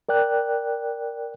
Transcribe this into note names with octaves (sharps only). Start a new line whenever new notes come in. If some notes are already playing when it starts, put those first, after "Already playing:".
A#4 D5 G5 F#6